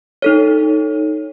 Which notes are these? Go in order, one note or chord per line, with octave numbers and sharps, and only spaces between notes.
D#4 A4 C#5